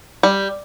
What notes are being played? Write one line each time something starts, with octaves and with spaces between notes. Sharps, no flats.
G3